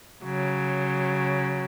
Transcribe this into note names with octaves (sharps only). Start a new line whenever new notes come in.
C#3 F#3